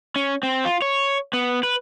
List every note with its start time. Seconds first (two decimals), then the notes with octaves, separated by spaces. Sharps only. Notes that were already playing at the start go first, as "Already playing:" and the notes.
0.16 C#4
0.43 C4
0.65 F4
0.82 C#5
1.33 B3
1.63 B4